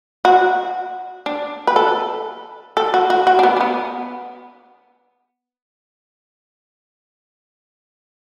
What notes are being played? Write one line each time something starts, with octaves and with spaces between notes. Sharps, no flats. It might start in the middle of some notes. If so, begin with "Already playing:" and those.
F#4
D4
B4
A4
A4
F#4
F#4
F#4
D4
B3
D4
B3